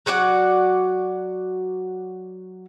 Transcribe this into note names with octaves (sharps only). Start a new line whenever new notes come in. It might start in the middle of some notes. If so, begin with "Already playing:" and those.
F#3 F#4 D5 F#5